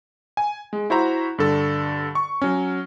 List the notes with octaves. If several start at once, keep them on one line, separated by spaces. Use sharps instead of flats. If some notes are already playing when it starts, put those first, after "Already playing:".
G#5
G#3
E4 F#4 C5 E5 A#5
G2 D3 A4
C#6
F#3 C#4